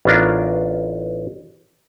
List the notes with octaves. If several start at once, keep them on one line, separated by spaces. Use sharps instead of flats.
A1 B3 C#4 D4 F4 A#4